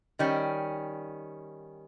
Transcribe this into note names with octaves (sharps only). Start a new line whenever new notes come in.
D#3 G3 C#4